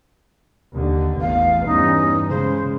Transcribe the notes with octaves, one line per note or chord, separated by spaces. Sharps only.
D#2 D3
A1 E2 F5
E2 G2 C#4 D#4
C#3 G#3 C5